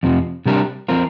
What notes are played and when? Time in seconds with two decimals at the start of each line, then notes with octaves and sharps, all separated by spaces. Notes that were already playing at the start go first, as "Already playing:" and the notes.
0.03 F2 C3 F3
0.46 C3 G3 D4 G4 A#4
0.88 F3 C4 F4 A#4